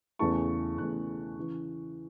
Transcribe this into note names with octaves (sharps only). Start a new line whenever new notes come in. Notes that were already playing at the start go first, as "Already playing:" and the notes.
E2 C#3 E3 A3 A5 C#6
E2 C#3 E3 A3 C#6 F#6
C#3 E3